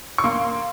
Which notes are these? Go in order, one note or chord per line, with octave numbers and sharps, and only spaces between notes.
C#6
A#3 C6